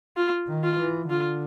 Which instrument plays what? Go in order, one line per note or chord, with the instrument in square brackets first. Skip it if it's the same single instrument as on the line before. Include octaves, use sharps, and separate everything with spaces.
[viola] F4
[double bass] D#3
[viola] F4
[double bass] E3
[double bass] D3 [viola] F4